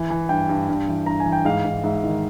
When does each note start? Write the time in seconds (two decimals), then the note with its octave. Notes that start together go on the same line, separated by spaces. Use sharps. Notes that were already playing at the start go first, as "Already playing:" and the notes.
Already playing: E3
0.10 E3
0.29 G2 G5
0.49 G2
0.69 G2
0.88 E3
1.06 G2 A#5
1.20 G#5
1.26 E3
1.32 G5
1.45 G#2 F5
1.65 G#2
1.83 G#2 E5
2.04 D#3